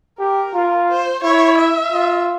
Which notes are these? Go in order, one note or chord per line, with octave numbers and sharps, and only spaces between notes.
G4 A#4
F4
C5
E4 C#5
E5
F4